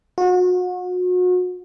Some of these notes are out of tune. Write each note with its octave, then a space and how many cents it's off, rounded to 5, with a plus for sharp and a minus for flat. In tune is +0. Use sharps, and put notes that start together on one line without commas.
F#4 -35